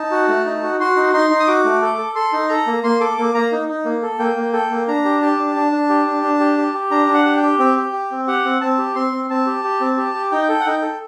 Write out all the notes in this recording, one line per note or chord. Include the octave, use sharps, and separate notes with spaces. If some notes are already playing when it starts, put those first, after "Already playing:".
Already playing: D#4 A5
F#4
A3
D#4
F#4
F#4 C6
D#4
D#4 C6
D#4
D#6
F#4 D6
A3
A4
A4
A4 C6
D#4
A4 A#5
A#3
A#3 C6
A4 D6
A#3 D6
A#3 A#5
D#4
D#4
A#3
A4
A#3 G5
A#3
A4 G5
A#3
D4 A#5
G4
G4 A5
D4
D4
D4
G4
D4
D4
G4
G4
G4
D4 A#5
D4
F#5
G4
G5
G4
C4 G5
G4
G4
C4
G4 F#5
C4
C4 A5
G4
C4 C6
C4
C4 A5
G4
G4
C4
G4
G4
D#4 G5
A4
F#5
D#4 G5
A4